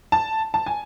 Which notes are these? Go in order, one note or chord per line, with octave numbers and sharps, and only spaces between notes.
A5
A5
G#5